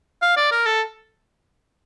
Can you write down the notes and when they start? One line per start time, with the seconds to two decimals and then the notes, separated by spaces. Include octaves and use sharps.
0.22 F5
0.37 D5
0.52 A#4
0.66 A4